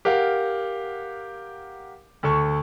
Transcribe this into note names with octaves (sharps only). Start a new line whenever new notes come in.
G4 A#4 F5 F#5
D2 A4 C#6